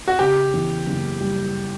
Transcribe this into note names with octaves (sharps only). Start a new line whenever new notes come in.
F#4
C#3 G4
E2
F#1
G3